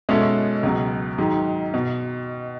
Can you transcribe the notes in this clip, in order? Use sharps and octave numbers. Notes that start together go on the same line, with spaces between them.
B2 G#3 C#4 E4 A4
C#2 B2 F#3
G#2 D#3 F#3
B2